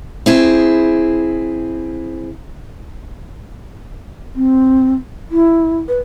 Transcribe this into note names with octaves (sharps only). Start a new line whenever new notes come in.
C4 E4 G#4
C4
E4
B4